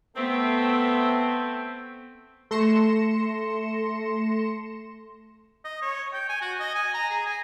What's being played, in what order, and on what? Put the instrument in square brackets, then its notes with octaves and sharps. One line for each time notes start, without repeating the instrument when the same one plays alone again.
[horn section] A3 C4 [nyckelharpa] B3
[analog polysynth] A3 C6 A#6 C#7 E7
[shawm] D#5
C#5
G5
G#5
F#4
D#5
G#5
A#5
G#4
G#5